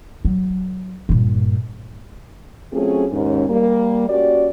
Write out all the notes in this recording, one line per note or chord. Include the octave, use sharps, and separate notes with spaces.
F#3
G2 A#2
F#3 A3 C4 C#4 F4 G#4
D#2 G#2 C#4
G3 A#3
C#4 F#4 G4 D5